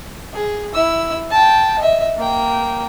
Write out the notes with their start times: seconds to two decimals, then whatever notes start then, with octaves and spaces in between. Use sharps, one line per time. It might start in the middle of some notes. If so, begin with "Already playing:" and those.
0.34 G#4
0.74 E4 E6
1.31 G5 A5
1.79 D#5 E5
2.17 A#3 G5